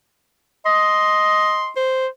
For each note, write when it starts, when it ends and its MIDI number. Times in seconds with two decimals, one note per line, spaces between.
0.66 1.69 75
0.66 1.70 84
1.76 2.07 72